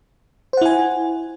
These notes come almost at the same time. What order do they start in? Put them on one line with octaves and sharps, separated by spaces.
C5 F#5 E4 G#5